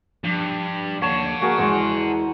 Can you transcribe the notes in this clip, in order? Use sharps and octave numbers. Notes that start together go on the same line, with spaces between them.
G2 F3
D#2 D3 C#5 F#5 A5
A#3 F#4 G#4 A#4
E2 E3 G#3 C5